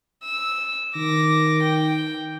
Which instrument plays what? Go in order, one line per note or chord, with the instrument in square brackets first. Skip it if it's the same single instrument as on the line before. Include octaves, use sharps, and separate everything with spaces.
[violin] E6
[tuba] D#3 [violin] D6 A#6
[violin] G5